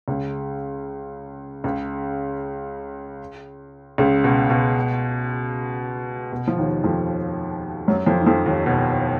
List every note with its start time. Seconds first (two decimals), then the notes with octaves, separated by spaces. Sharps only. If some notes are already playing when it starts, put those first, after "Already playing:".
0.08 C#2 C#3
1.64 C#2 C#3
3.98 C#2 C#3
4.24 B2
4.50 B2
6.32 B2
6.48 F3
6.58 D#2 D#3
6.84 F2 F3
7.88 F#2 F#3
8.07 F2 F3
8.20 D#3
8.26 F2 F3
8.46 D#2 D#3
8.66 B2